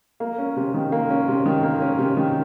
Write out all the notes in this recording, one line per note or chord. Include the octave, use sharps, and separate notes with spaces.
A#3
C#4
C3
D#3
A#3
C#4
C3
D#3
A#3
C#4
C3
D#3